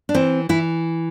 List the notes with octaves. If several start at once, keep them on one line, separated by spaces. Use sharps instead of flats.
D4
E3 C4
E3 E4